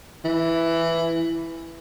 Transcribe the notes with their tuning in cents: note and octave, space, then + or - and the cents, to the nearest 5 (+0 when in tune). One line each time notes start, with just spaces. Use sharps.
E3 +5